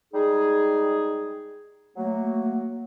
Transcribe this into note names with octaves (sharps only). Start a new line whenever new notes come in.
G3 G#3 D#4 G#4
F#3 A3 A#3